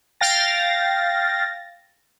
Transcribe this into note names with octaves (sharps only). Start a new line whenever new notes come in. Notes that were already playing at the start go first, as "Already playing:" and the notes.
F5 G5 A6 A#6